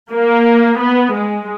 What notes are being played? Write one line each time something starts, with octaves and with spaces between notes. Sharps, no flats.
A#3
B3
G#3